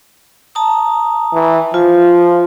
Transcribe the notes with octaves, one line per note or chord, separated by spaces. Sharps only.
A5 A#5 D#6
E3
F3 F4